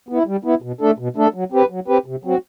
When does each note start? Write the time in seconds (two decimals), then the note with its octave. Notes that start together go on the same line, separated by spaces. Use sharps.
0.09 B3 E4
0.27 G3
0.44 B3 E4
0.62 B2
0.81 A3 D4 A4
0.98 B2
1.16 A3 D4 A4
1.34 F#3
1.52 C4 G4 B4
1.70 F#3
1.88 C4 G4 B4
2.06 C3
2.24 F#3 C4 F#4